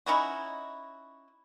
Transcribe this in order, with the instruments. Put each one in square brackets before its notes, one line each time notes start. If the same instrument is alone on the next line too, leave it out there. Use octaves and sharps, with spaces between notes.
[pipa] C#4 D#4 E4 F#4